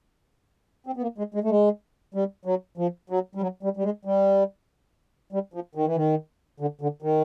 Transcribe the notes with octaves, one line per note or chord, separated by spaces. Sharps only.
C4
B3
A#3
G#3
G#3
A3
G#3
G3
F#3
F3
F#3
G3
F#3
G3
G3
G#3
G3
G3
F3
D#3
E3
D#3
D3
D3
D#3